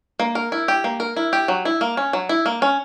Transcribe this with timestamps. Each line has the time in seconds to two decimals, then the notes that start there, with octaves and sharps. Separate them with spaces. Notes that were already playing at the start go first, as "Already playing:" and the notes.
0.20 A#3
0.35 A#4
0.52 E4
0.68 G4
0.84 A#3
1.00 A#4
1.16 E4
1.33 G4
1.48 F#3
1.65 E4
1.81 A#3
1.97 C#4
2.13 F#3
2.29 E4
2.46 A#3
2.62 C#4